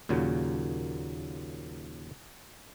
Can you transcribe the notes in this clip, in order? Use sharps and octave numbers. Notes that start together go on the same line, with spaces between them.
D#2 A#2 C#3 F#3